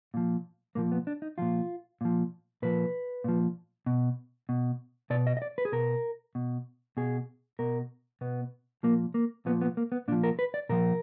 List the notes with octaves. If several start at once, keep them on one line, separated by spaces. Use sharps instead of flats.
A#2 F3
A#2 F3 A#3
B3
D4
D#4
A#2 F3 F4
A#2 F3
A#2 F3 B4
A#2 F3
B2
B2
B2 D5
D#5
D#5
D5
B4
G#4
B2 A#4
B2
B2 G#4
B2 A#4
B2 B3
A#2 F3 A#3
A#3
A#2 F3 B3
B3
A#3
B3
A#2 F3 D4
A#4
B4
D5
A#2 F3 A#4